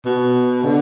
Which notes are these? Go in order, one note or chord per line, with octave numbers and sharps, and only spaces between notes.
B2
D3